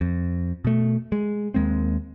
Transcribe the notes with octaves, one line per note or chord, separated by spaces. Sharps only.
F2
B2 A3
G#3
D#2 G#3 A#3 C4